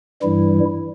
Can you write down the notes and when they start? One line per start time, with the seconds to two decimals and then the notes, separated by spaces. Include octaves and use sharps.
0.22 G2 E3 G3 E4